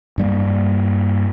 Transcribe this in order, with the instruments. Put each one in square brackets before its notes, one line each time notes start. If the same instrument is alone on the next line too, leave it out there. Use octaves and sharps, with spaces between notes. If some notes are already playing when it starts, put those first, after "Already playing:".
[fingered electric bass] G2 G3 A#3